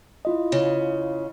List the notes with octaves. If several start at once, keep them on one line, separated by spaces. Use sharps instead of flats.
E4 F4 D#5
C#3